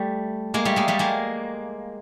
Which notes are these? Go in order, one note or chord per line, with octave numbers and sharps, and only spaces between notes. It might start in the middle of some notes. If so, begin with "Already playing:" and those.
Already playing: G3 A3
G#3 A#3
G3 A3
G#3 A#3
G3 A3
G#3 A#3